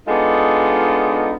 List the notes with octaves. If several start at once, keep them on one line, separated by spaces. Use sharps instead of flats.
G#3 B3 D4 D#4 F4 A4